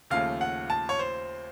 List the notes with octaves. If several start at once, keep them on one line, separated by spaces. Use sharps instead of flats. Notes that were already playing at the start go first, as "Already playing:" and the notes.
D#2 C#3 F3 A3 F5
F#5
A5
C#5
C5